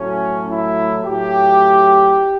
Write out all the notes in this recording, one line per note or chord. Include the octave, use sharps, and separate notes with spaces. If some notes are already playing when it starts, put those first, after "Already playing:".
Already playing: A2 F#3 A3 C#4
E4
A2 F#3 A3 G4